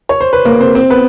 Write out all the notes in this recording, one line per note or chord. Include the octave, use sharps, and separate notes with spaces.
C#5
C5
B4
A#3 A#4
C4 C5
C4 C5
B3 B4